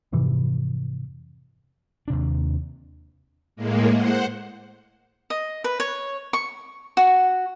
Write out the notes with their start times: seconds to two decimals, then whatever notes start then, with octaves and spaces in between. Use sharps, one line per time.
0.12 F2 G#2 C3 E3
2.08 D#2 C3 D4
3.56 A2 G#3 A#3
3.94 C5 F#5
5.30 D#5
5.64 B4
5.80 C#5
6.33 C#6
6.97 F#4